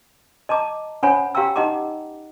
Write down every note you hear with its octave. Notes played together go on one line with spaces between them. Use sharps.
D#5 A5 A#5 D6
C#4 C5 C#5 F#5 G#5 B5
G4 F5 G5 A#5 E6
D#4 G4 D#5 F#5 A#5 D6